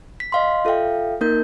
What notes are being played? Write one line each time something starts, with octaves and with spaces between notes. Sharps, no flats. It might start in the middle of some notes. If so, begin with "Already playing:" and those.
B6
D#5 F5 C6
F4 A4 E5 F5 G5
A#3 D#4 A#4 G6